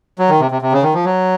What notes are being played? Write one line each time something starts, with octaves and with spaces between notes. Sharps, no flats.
F#3
D#3
C3
C3
C3
C#3
D#3
F3
F#3